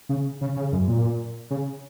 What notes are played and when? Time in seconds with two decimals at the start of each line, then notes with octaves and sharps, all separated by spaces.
0.09 C#3
0.41 C#3
0.57 C#3
0.72 F#2
0.88 A#2
1.51 C#3